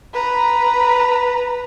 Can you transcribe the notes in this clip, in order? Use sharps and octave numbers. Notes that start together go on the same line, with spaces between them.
B4 A#5